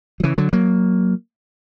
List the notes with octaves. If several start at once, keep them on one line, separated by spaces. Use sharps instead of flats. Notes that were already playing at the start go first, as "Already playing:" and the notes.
F#3
C#3 E3
D3 F#3
F#3 A#3